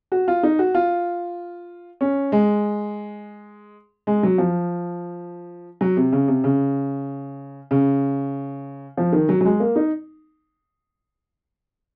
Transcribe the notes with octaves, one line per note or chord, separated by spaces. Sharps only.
F#4
F4
D#4
F#4
F4
C#4
G#3
G#3
F#3
F3
F#3
C3
C#3
C3
C#3
C#3
F3
D#3
F#3
F#3
G#3
A#3
D#4